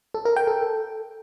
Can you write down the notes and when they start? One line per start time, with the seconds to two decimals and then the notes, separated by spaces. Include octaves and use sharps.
0.14 A4
0.25 A#4
0.36 G5
0.47 A4